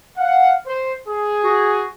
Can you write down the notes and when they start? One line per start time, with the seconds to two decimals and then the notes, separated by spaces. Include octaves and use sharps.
0.18 F5 F#5
0.67 C5
1.09 G#4
1.44 F#4